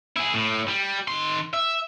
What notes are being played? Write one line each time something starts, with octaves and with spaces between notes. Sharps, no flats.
E4 G#4
A2
G3
D#3 C6
E5